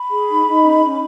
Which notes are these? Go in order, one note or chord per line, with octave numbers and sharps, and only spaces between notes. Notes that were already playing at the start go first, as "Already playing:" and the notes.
Already playing: B5
G#4
D#4
D#4
C#4
C#4